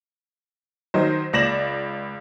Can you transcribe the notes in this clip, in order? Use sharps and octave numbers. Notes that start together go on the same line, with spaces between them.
D#3 F#3 D#4 C5
C#2 D5 A#6 E7 F#7